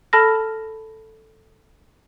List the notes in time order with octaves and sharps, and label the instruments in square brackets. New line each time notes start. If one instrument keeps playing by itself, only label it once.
[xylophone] A4 A5 B5 F6 A#6